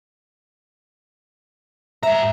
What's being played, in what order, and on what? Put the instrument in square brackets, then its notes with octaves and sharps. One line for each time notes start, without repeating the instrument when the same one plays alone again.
[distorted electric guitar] G2 A#5 [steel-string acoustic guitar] E5